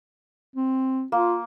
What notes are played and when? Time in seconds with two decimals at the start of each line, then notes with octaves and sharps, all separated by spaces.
0.56 C4
1.12 A#3 F4